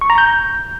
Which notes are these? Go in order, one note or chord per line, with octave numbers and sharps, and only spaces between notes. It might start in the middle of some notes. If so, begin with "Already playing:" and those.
C#6
A#5
G6